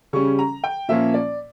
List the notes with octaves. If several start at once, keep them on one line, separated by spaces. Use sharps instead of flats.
C#3 G3 C#4 C#6
A#5
G5
A#2 F3 A#3 C#4 E5
D5